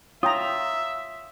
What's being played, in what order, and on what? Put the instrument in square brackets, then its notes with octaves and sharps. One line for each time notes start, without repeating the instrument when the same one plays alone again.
[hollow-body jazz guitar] F4 [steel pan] C#5 G5 A#5 [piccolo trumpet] E5 [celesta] D#6